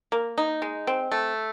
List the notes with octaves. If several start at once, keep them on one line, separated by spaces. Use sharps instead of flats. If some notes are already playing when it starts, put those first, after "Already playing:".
A#3
D#4
G#3
C4
A3